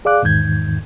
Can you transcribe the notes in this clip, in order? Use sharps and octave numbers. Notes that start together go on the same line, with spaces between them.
G#4 D5 F5 D6 F#6
E2 G#2 D#3 G6 G#6